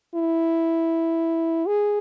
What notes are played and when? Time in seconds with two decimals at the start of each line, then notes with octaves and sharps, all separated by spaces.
0.15 E4
1.67 G#4